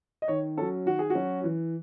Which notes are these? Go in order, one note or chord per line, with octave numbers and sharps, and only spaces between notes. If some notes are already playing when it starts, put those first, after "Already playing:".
D#5
D#3 C#5
F#3 C#4 A4
D#3 F#4
G#4
F#4
F#3 C#4
E3